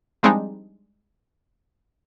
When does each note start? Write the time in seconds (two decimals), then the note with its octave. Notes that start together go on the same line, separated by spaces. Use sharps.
0.23 F3 G3 G#3 C4 D4 D#4